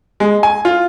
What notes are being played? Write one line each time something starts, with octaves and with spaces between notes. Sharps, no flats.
G#3
G#5
F4